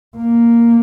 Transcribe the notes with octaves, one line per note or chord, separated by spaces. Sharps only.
A#3